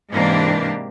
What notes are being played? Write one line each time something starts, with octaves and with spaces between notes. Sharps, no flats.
G#2 C3 E3 A#3 D4 G4